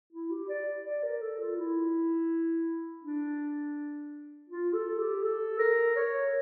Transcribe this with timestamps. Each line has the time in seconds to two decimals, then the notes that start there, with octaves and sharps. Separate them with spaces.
0.13 E4
0.31 G4
0.49 D5
0.85 D5
1.03 A#4
1.22 A4
1.40 F4
1.59 E4
3.04 D4
4.49 F4
4.73 A4
4.98 G4
5.23 A4
5.59 A#4
5.96 C#5